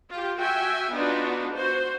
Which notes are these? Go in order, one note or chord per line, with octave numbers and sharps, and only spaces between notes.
F4 G4
F#4 E5 G5 G#5
B3 D4 D#4 F4 F#4
F#4 C5